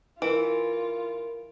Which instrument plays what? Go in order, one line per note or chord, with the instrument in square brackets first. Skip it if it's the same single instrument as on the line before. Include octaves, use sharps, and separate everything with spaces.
[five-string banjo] E3 [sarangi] F4 [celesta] A#4 D7